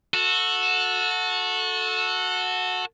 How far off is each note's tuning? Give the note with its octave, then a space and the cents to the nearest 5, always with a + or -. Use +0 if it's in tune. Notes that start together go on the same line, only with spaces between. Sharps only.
F#4 -20 A4 +0